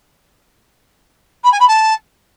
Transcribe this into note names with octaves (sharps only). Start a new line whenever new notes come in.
B5
G#5
B5
A5